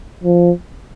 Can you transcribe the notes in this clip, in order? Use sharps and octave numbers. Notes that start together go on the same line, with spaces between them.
F3